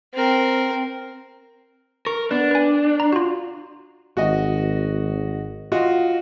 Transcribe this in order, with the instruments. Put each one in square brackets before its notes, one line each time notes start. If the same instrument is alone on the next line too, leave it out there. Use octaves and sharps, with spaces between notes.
[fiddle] C4 A#4
[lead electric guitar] A#4 [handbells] C#6
[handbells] B3 B4 [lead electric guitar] D4
[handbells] B4 G#5
A#5
F4 F#4
[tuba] G#1 [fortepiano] F#4 D#5
[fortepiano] F4 F#4 D#5